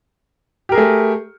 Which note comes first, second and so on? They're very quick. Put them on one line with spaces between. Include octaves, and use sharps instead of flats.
G4 A#4 G#4 A3